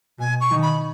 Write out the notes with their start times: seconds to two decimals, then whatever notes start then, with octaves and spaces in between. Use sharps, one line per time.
0.19 B2 G#5
0.40 C#6
0.51 D#3
0.62 B5